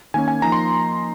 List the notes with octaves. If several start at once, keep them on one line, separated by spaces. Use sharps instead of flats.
D#3 A#3 C#4 G#5
G#5
F3 A#3 D#4 A#5
C6